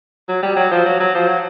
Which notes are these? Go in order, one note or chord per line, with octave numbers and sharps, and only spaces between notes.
F#3
G3
F#3
F3
F#3
F#3
F3
F#3